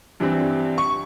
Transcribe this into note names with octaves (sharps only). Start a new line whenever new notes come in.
G2 E3 G3 C4
C#6